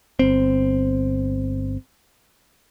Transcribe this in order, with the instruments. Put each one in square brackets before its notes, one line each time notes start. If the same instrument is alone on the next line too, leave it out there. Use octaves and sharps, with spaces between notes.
[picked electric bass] G1 C4